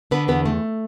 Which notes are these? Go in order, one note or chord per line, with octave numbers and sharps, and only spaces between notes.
D3 B3 B4
E2 B3 B4
A3